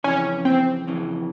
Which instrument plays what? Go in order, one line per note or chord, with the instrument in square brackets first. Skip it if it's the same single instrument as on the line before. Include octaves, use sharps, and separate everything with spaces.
[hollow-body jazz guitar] F2 C#3 E3 [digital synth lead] C#4
[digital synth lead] C4
[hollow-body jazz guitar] F2 C#3 E3